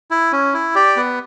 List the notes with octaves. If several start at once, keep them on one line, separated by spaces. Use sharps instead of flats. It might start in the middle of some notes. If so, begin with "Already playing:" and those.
E4
C#4
E4
G4 D5
B3